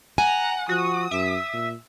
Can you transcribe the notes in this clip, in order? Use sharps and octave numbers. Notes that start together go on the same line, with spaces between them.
F#5 G#5 A#5
F3 F#4 D#6
F#2 E5
A#2